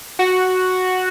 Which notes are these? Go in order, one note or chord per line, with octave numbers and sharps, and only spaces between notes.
F#4